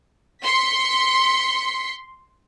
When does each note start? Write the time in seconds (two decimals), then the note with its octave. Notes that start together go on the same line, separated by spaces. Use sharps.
0.43 C6 B6 C#7